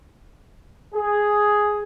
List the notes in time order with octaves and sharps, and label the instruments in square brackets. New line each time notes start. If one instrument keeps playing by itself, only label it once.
[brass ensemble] G#4